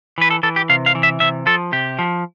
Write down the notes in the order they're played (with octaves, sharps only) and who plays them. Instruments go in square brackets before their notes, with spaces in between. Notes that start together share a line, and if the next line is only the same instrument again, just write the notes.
[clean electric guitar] E3 B4
A4
E3 A4
G4
C3 F5
F5
E3
E5
C3 E5
F3 A4
C3 G4
F3